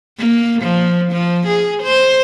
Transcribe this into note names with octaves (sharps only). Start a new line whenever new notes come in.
A#3
F3
F3
G#4
C5